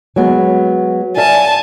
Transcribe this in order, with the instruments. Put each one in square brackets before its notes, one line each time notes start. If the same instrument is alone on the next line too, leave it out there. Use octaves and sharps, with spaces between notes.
[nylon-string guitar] F#3 G#3 B3
[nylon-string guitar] D5 E5 F5 [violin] G#5 A5